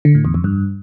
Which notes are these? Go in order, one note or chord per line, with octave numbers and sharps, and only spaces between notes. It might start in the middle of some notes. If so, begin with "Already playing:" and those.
D3
A2
E2
F2
G2